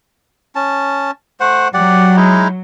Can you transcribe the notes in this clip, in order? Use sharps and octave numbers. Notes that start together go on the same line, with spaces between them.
C#4 A5
A3 C5 F#5
F#3 G4 D5 F#5
G#3 D#4 E4